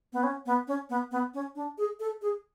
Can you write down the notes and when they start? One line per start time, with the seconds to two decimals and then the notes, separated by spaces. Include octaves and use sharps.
0.13 B3
0.23 C#4
0.46 B3
0.68 C#4
0.90 B3
1.11 B3
1.34 C#4
1.55 D4
1.78 G#4
2.00 A4
2.22 G#4